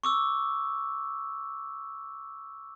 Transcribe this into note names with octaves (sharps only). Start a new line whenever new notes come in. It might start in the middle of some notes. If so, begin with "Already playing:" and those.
C#6 D6 E6